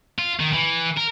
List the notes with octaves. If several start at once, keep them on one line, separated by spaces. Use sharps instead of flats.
F4
D#3
E3
A#4